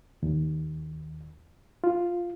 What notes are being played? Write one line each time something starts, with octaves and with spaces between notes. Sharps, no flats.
D#2
F4